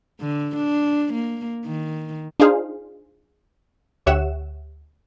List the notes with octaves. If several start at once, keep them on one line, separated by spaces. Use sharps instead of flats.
D3
D4
A#3
D#3
D4 D#4 F4 G#4 C5 F5
D2 G4 C#5 E5 F#5 E7